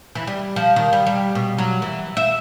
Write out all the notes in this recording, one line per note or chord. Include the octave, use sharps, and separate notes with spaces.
E3
G3
F3
D#3
G3
G3
B2
F#3
E3
E5